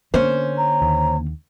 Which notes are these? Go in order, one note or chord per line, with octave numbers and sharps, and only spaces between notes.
D3 A#3 C#4 C5
A#5
D#2